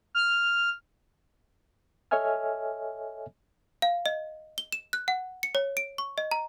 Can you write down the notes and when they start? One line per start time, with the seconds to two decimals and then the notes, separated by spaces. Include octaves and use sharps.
0.15 F6
2.11 A4 C#5 D#5 E5 G#5 F6
3.82 F5
4.06 D#5
4.58 G7
4.72 E7
4.93 F#6
5.08 F#5
5.43 C#7
5.55 C#5
5.77 D7
5.98 C#6
6.18 D#5
6.31 A#5